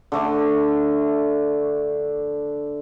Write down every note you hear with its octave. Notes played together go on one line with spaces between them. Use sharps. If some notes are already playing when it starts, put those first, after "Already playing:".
D3 A3 D4